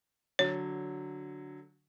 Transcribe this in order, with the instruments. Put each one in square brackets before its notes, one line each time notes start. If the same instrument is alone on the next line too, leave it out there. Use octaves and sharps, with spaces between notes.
[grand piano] D3 F#3 [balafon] C#5